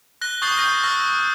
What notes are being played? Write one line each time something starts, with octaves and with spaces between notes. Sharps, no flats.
F#6 A#6 G7
C#6 D#6 G6 A6 C7 G7
C#6 D#6 F6 G6 A#6 D#7
C#6 E6 F6 A#6